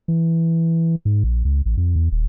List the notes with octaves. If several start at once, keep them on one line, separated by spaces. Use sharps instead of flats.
E3
G#2
A#1
C#2
A1
F2
E2
D#1